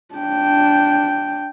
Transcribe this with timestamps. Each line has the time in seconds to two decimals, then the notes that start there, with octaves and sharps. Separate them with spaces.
0.15 D4 G5